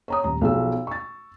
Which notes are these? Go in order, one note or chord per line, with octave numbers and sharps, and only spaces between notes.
C#5 A#5 D#6
D#1 A#5
B1 F3 G#4 E6
C#6 A6